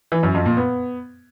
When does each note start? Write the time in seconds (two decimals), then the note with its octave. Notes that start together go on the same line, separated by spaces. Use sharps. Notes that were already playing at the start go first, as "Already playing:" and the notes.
0.12 E3
0.23 F#2
0.34 F2
0.46 A#2
0.57 B3